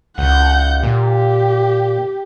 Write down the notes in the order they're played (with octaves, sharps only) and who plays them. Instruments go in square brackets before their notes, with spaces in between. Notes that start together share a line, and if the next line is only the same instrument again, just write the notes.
[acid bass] C#2 [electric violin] F#5 G6
[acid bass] A#2 [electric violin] G4